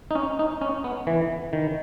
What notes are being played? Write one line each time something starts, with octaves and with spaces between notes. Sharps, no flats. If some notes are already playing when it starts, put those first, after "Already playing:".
D#4
C#4
D#4
C#4
B3
E3
D#3